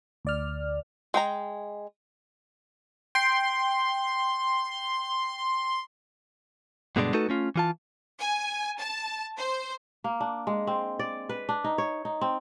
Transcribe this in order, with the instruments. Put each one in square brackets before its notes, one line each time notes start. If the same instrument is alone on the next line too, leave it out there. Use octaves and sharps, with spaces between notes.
[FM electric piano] D2 D5 F6
[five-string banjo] G#3 G5 A#5
[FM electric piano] G5 C7 [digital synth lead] C6
[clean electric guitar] G2 B2 D3 G#3 C#4 D4
A3 D#4 F#4 A4 B4
A3 C#4 F4
E3 F4 A5
[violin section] G#5
A5
C5
[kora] A#3
D4
G#3
C4
D5
B4
D4
D#4
C#5
D#4
C4